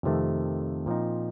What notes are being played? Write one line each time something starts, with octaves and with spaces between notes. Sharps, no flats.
F2 C3 D#3 A3
A#2 F3 C4 D#4